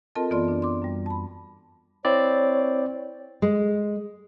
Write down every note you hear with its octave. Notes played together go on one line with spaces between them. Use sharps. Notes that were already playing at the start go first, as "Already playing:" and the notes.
C4 F4 A4 A#4 D#5 A5
F#2 E3 B3 F4 D5 C6
D4
C6 D6
F#2 G3
A5 B5
C4 E4 C#5 D5
G#3